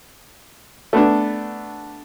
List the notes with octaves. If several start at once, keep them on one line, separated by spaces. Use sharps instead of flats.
A3 B3 D4